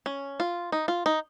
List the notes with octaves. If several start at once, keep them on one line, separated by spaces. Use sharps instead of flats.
C#4
F4
D#4
F4
D#4